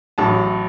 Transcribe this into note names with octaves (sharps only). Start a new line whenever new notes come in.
A1 A2 F#3 A5